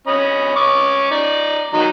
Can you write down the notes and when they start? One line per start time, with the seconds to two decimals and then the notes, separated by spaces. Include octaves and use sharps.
0.07 C#4 D#5 B5
0.56 C#4 C#6 D6
1.11 D#4 D5
1.74 D#3 F#3 D#4